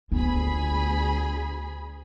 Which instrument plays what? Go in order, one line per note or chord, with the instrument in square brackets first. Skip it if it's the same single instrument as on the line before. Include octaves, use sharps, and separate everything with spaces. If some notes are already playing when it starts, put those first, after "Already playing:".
[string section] D2 G#4 B5 [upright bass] B3 F4